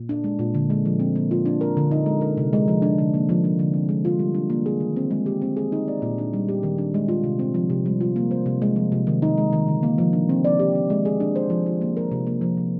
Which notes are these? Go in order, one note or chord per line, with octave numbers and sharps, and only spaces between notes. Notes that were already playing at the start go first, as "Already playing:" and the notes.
Already playing: A#2
D4
G#3
A#2
D3
G#3
F3
C4
A#3
F4
D4
A#4
D3
D#4
G#3
A#4
C3
G#3
F3
D4
D3
A#3
F3
D4
D3
C4
G#3
F4
G3
D4
A#3
G#4
D#3
C4
G#3
G4
C4
G#4
D#4
D5
A#2
D4
G3
G4
D#3
D4
G#3
F4
C3
C4
F3
C3
G3
F4
A#3
C5
C3
G#3
F3
C3
D#3
D#4
G#3
D#3
D3
A#3
F3
D4
C4
D5
G4
C4
G#3
G#4
D4
C5
F3
F4
A#3
A#4
C3
A#3
F3
C3